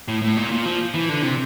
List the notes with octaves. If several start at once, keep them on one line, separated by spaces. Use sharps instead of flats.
A2
A2
A#2
A#2
F3
E3
D3
C3